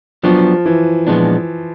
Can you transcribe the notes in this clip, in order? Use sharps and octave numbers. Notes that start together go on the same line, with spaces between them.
F3 F#3 B3 D4 G4
E3
A#2 F3 G#3 B3 D4